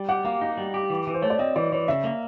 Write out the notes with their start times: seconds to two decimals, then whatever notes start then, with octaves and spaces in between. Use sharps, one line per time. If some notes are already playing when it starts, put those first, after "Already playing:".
Already playing: G3
0.09 G4 F#5
0.25 A#3 F5
0.41 D#4
0.58 G3
0.74 G4
0.90 E3
1.07 E3
1.14 C5
1.22 A3 C#5
1.30 D5
1.39 C4 D#5
1.56 E3 D5
1.72 E3 C#5
1.88 C#3 E5
2.04 A#3